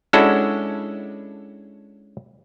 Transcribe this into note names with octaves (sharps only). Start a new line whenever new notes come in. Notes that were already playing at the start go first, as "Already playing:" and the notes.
G#3 C#4 D4 E4 F#4 A4